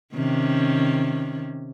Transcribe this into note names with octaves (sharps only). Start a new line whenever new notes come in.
C3 D#3 C#4